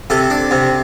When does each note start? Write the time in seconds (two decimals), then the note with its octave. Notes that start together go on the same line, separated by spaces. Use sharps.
0.10 C3 A4
0.30 D4
0.51 C3